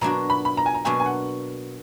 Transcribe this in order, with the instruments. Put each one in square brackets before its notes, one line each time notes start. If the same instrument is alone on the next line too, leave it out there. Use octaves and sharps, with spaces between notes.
[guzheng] B2 F#3 A#3 D4 F#4 [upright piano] A#5
[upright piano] B5
B5
A#5
G#5
A#5
[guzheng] B2 F#3 A#3 D4 F#4 [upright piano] G#5
[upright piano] G#5
F#5